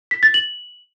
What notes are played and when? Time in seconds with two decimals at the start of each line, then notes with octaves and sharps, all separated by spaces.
0.11 B6
0.23 A6
0.34 F#7